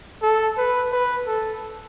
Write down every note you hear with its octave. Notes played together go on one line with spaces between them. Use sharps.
A4
B4
B4
A4